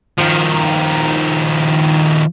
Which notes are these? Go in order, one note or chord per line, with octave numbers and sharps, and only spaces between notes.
D#3 F3